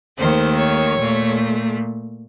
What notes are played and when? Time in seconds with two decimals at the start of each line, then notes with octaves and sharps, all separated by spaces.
0.18 D#2 D#3 A3 C5
0.57 C#5
0.97 A#2 A3